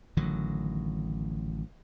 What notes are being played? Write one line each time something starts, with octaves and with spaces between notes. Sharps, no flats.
A1 D3 D#3 F#3